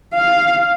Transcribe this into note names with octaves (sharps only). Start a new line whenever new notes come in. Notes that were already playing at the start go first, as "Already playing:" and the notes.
F5